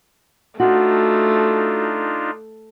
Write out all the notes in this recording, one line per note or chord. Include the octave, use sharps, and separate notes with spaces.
A3 D4 D#4 F4 F#4